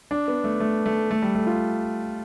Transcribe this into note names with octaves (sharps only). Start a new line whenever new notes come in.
D4
B3
A3
A3
A3
A3
G3
A3
F4